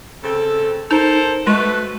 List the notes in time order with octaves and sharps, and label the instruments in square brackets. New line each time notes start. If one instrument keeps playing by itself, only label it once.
[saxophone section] C#3 C4 A4
[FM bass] D#4 [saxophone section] A4 A#4 C5
[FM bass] G#3 [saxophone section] A3 F#4 B4